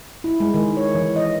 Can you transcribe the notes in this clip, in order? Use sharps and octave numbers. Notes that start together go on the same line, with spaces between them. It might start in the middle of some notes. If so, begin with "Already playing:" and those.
E4
G#3
D#3
C#5
E3
D#5